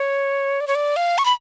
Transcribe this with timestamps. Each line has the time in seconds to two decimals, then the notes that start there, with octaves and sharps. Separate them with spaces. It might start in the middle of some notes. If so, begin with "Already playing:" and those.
Already playing: C#5
0.60 D5
0.67 C#5
0.75 D5
0.96 F5
1.18 C#6
1.25 B5